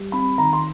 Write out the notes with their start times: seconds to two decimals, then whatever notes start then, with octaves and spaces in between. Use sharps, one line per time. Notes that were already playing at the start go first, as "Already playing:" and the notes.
Already playing: G3
0.12 C4 B5
0.38 D#3 A#5
0.53 C6